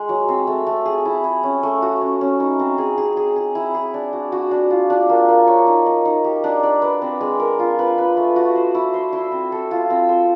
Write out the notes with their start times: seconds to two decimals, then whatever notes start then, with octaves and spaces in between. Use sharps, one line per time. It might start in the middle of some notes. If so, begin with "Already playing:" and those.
Already playing: G#3
0.09 F#3
0.28 C4
0.47 A3
0.67 A3
0.86 G#4
1.05 E4
1.24 G#4
1.43 C#4
1.63 A3
1.82 F#4
2.01 C#4
2.21 C#4
2.40 D#4
2.59 C4
2.78 G#4
2.98 G#4
3.17 G#4
3.36 G#4
3.55 E4
3.74 G#4
3.94 D4
4.13 F#4
4.32 F#4
4.51 D4
4.70 F4
4.90 D4
5.09 A#3
5.29 A#3
5.47 C#5
5.67 D#4
5.86 D#4
6.05 D#4
6.24 G4
6.44 D4
6.63 D5
6.82 B4
7.02 C4
7.21 G#3
7.40 A#4
7.59 F4
7.79 B4
7.98 B4
8.17 A3
8.36 F#4
8.55 C5
8.75 E4
8.94 C5
9.13 E4
9.32 C4
9.52 A4
9.71 F4
9.90 C4
10.09 C5